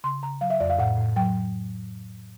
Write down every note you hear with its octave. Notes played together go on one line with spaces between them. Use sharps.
C#3 C6
C#3 A#5
F#3 F5
E5
F2 D5
F5
A2 F#5
A2
F#3 G5